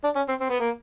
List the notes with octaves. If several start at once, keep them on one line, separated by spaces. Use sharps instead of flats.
D4
C#4
C4
C4
B3
A#3